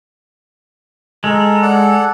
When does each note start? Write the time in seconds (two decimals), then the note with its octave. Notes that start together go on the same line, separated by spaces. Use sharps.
1.24 G#3 A4 A#4
1.62 A4 D5 F#5